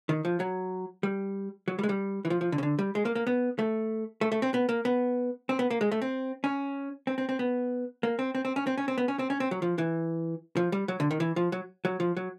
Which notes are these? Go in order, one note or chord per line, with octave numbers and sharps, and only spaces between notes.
D#3
F3
F#3
G3
F#3
G3
G#3
G3
E3
F3
F3
D3
C#3
D3
G3
G#3
A#3
A#3
B3
A3
A3
A3
C4
B3
A#3
B3
C4
B3
A#3
G#3
A3
C4
C#4
C4
C4
C4
B3
A#3
C4
C4
C4
C#4
C4
C#4
C4
B3
C#4
C4
C#4
C4
F#3
F3
E3
F3
G3
F#3
D3
D#3
E3
F3
F#3
F#3
F3
F#3